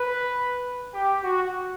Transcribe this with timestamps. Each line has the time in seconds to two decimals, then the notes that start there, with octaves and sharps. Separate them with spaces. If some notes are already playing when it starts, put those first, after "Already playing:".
Already playing: B4
0.94 G4
1.24 F#4